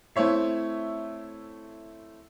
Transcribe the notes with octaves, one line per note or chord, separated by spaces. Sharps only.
A3 C4 E4 C#5 E5